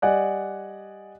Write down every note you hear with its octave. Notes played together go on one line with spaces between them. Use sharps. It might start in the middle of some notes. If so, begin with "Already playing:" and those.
G3 D5 D#5 F#5 G#5 F#6